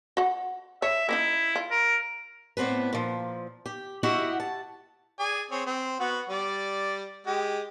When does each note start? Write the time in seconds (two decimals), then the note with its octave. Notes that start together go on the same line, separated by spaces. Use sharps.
0.17 F#4 F#5
0.82 C#5 E5
1.09 A#3 C#4 D#4 E4
1.56 F4
1.71 A#4
2.57 A2 B3 C4 D4 B4
2.93 A#2 F3
3.66 G4
4.03 E4 F#4 G4 D#5 E5 F#5
4.40 A5
5.19 G#4 D5 G#5
5.51 C4 G#4 C#5
5.66 C4
6.00 B3 F#4
6.29 G3 D5
7.27 G#3 G4